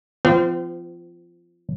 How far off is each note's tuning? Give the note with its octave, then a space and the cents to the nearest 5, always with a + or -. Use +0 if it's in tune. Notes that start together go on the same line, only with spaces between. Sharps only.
F3 -20 C4 -40